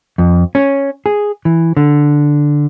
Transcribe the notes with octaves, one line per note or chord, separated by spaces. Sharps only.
F2
C#4
G#4
E3
D3